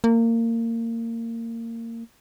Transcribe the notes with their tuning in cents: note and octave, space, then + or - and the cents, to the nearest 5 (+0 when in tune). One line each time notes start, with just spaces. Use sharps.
A#3 -25